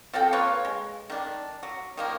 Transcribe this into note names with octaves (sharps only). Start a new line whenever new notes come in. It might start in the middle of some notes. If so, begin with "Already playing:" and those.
F3 C4 A4 G5
A#3 F4 B4 C#5
G#3
D#3 D4
F#3
D#3 F3 A#3